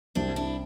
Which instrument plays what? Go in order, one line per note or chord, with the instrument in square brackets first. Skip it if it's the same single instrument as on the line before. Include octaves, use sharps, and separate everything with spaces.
[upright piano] C2 [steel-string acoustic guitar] C4 D4
[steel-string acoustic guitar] D4 E4